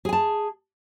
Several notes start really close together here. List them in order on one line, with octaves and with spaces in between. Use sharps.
G#4 G#5 A5